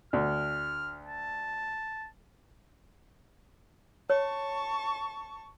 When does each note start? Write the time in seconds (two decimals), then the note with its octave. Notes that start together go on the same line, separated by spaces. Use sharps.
0.13 D2 F6
1.07 A5
4.10 C#5 A5 C#6